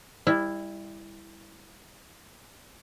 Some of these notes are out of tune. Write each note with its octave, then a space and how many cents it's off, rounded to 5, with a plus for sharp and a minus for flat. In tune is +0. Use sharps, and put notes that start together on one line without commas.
G3 +30 E4 +0